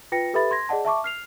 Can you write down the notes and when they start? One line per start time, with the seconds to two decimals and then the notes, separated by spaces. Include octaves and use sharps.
0.12 F4 B4 G5 A#6 C#7
0.34 G4 A4 B4 E5 B5 A6
0.51 C6 G#6 A#6
0.69 G#4 D5 D#5 F#5 A5
0.85 E5 A5 C#6 D6
1.04 F6 C7 F7